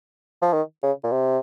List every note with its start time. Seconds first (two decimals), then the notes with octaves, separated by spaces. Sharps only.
0.42 F3
0.53 D#3
0.83 C#3
1.04 A#2
1.12 C3